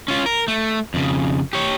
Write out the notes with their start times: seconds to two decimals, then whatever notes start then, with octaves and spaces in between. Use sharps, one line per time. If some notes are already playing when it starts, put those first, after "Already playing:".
0.08 C#4 F4
0.26 A#4
0.48 A3
0.94 F2 C#3
1.53 G4 C#5